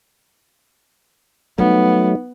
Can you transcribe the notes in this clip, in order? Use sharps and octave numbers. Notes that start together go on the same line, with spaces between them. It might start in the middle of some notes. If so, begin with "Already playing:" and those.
F#3 G3 A3 B3 D#4